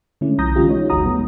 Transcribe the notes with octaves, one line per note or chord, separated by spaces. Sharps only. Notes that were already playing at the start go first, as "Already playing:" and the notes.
D3 G#3 A3 C#4 E4
B1 F3 A#5 D#6 G6 A#6
D3 E3 G#3 C#4 F4 G4
D#4 F4 C#5
G1 D2 G#3 F#4 A#5 D#6
B2 F#3 G#3 A3 B3